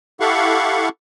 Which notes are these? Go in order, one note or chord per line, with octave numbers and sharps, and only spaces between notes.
E4 G4 A4 F5 F#5 C#6